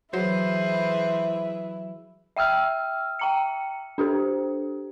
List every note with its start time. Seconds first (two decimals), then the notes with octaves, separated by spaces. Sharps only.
0.13 E3 F#3 E4 G#4 B4 C5
2.36 E5 G5 E6 F6
3.19 G5 A#5 C#7
3.98 D4 G4 A4 C5